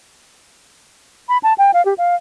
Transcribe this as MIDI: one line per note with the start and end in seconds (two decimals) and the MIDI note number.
1.29 1.38 83
1.43 1.54 81
1.58 1.71 79
1.74 1.84 77
1.85 1.94 67
1.98 2.15 77